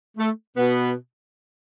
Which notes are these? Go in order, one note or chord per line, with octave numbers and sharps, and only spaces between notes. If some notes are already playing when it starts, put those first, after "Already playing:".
A3
B2 B3